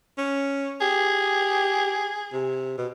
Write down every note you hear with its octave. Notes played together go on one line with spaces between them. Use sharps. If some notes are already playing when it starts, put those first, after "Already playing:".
C#4
G4 G#4
C3
B2